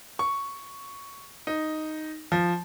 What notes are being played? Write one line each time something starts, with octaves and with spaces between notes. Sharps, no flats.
C#6
D#4
F3